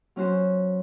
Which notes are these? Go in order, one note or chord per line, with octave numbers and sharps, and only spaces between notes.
F#3 C#4 F#4 C5